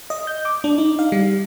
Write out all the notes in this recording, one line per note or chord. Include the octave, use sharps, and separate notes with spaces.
D#5
G6
D6
D4
D#4
F5
G3